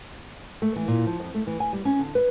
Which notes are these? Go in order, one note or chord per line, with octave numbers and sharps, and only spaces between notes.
A3
E3
A#2
F3
F2
A3
E3
G#5
G3
C#4
D3
B4